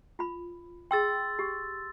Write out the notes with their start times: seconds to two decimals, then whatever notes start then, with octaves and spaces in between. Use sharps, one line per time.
0.19 F4 B5
0.91 G#4 G5 C6 E6 A6
1.39 G4